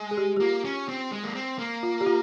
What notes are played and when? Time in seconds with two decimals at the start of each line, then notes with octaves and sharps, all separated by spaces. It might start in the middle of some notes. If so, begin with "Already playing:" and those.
Already playing: G#3
0.11 G#4
0.17 G4
0.36 G4
0.40 A#3 F4
0.64 C#4
0.89 C4
1.12 G#3
1.24 A#3
1.35 C4
1.58 A#3
1.83 F4
2.01 G4
2.06 F4